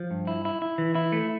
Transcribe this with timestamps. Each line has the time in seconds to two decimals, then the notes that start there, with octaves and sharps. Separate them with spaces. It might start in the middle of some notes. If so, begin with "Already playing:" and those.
Already playing: F3
0.11 G2
0.27 E4
0.45 E4
0.62 E4
0.78 E3
0.95 E4
1.12 A3